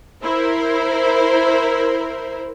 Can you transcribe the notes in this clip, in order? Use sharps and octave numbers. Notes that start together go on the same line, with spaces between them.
E4 A#4 C5